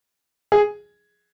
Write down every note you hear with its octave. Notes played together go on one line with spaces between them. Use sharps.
G#4